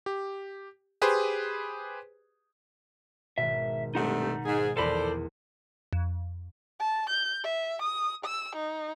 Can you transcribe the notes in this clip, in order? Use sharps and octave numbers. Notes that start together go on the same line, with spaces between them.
G4
G4 G#4 B4 C5
G#1 B2 E5
G2 C3 A3 D#4 F#5
G#2 G#4
A#1 E2 A4 C5 D5 B5
F2
A5
G6
E5
D#6
E6
D#4